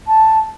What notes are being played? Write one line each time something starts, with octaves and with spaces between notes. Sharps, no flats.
A5